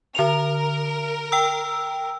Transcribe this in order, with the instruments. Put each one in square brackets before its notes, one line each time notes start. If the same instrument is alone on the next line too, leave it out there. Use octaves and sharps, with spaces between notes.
[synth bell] D3 F7 [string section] A#4
[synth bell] G5 E6